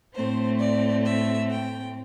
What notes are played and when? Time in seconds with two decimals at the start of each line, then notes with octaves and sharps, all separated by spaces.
0.14 A2 A3 C4 C5
0.59 D5
1.05 E5
1.50 G5